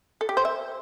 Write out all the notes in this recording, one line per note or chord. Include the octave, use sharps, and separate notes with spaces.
A4
G4
C5
E5